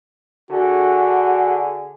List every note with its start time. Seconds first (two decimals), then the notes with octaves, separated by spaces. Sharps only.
0.51 D3 F#4 G#4